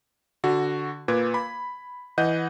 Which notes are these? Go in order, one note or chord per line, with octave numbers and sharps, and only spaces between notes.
D3 F#4
A#2 B4 D6 G#6
B5
E3 D#5 F#5 G6